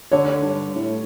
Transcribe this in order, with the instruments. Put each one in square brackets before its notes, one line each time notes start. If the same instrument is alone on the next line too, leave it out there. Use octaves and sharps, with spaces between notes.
[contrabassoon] D3 [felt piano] C#5
[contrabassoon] G2
A2